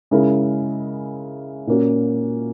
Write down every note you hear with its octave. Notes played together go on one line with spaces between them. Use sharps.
C#3 G#3 C#4 E4 A#4
A#2 A#3 C#4 F#4